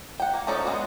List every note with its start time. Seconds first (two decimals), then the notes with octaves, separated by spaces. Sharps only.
0.20 F#5 G5
0.34 A#3
0.47 F3 C#4 D#4 A4 D5
0.64 G#3 B3 D4 F#4